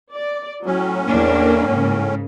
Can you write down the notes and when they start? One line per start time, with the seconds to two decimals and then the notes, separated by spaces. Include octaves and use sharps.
0.14 D5
0.66 A2 F#3 C#4
1.07 E2 A#3 D4
1.66 G#2 C#3